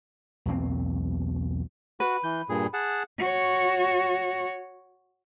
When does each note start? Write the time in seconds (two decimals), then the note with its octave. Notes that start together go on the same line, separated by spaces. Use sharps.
0.46 B1 E2 A#3 C4
2.00 F#4 B4
2.24 E3 G6
2.49 G2 A#2 G#4
2.74 G#4 F#5 A5
3.19 F#4 C#5